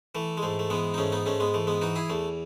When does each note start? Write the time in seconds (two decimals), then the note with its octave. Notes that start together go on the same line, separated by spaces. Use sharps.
0.15 E3 A3
0.37 G#3
0.42 G#2 A3
0.59 A3
0.70 E3 G#3 B3
0.94 D#4
0.98 G#2 A3 C#4
1.12 B3 D#4
1.26 G#2 A3 C#4
1.40 G#3 B3
1.54 E3 A3
1.67 G#3 B3
1.82 E3 D#4 F#4
1.96 E4 G#4
2.10 E2 A3